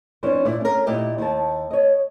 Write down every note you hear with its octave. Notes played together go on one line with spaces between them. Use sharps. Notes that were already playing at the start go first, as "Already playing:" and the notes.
F2 E3 C#4 D4 C5
A#2 E4 D5
C#4 A#4
A#2 D#4 E4 G4
D#2 A5
C#5 D#5